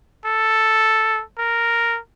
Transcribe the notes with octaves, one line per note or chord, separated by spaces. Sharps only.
A4
A#4